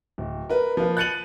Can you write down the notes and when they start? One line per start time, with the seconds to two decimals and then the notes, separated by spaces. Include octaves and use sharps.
0.18 D1
0.50 A#4 B4
0.77 F3 A#3 B4
0.97 F#6 G6 A6 C#7 D#7 F#7